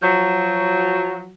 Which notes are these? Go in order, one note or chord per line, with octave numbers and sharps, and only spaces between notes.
F3 F#3